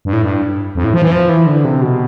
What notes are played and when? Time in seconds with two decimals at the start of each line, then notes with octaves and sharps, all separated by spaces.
0.05 G2
0.13 A2
0.22 G2
0.75 F2
0.84 A2
0.94 F3
1.02 E3
1.11 F3
1.29 E3
1.46 D3
1.65 C3
1.82 B2